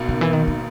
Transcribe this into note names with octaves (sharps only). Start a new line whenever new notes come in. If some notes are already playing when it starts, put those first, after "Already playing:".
Already playing: B1 B2 A#3 D#4
C#3
E3
D#3
D#3